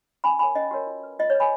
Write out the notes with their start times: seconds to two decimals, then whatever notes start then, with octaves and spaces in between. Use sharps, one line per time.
0.24 C#4 G#5 B5
0.39 F#4 A#4 C#5 G#5 B5
0.55 C#4 D#5
0.71 F#4 A#4 C#5
0.87 F4
1.03 B4
1.19 F4 D#5
1.30 C#5
1.34 B4
1.40 G#5 B5